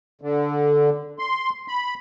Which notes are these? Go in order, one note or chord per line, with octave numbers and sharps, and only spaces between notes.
D3
C6
B5